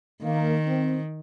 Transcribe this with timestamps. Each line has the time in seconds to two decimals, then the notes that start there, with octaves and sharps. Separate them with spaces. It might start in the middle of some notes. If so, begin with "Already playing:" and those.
0.23 D#3 A#3
0.66 C4